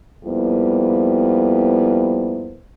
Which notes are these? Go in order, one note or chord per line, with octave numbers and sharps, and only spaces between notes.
F2 G3 A#3 B3 E4 C5